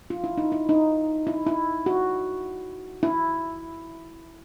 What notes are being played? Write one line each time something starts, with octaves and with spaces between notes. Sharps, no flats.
F4
E4
D#4
E4
D#4
E4
E4
F#4
E4